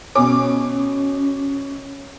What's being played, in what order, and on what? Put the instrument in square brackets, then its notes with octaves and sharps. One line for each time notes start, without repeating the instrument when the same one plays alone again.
[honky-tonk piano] B2 D6 [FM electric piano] C#4